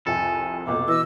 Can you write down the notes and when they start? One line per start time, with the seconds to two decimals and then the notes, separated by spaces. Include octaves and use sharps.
0.07 C2 F2 A4 G#5
0.67 F1 B1 A#2 D6
0.88 B2 E3 D#5 E6